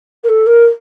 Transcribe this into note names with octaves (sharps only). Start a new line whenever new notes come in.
A#4
A4
A#4